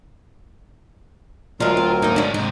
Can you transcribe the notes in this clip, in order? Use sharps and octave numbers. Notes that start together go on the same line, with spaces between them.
D2 D3 F#3 G#3 F4 A#4
C4
G#2 A#3 D#4
G#2 D3 D4 C#5
G#2 C3 D#4